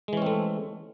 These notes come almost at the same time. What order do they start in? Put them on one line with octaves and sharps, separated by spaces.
G#3 E3 C#4 C4 A3